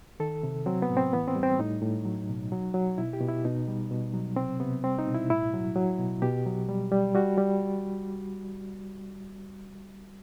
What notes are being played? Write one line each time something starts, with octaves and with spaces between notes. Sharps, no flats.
D#3 A4
C3
F#3 C4
B3
A2
C4
E3 B3
C4
G3
C4
A2 D#4
A2
F#3
B2
F#3
F#3
B2 E4
G4
B2
E4
B2 D#4
G3
B2
F#3
C3 C4
C3 B3
G3 C4
D#4
B2
E4
A2 E4
F#3
F#3
B2
B2 G4
F#3
G3
G3
G3 F#4
G3